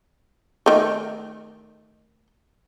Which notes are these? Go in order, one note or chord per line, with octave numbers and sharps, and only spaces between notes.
D#3 A3